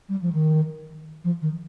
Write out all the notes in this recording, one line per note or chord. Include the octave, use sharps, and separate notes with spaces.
G3
F3
D#3
F3
D#3